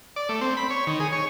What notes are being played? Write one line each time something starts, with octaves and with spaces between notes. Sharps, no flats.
D5
A3
C4
B5
C#5
D#3
G#4
C#5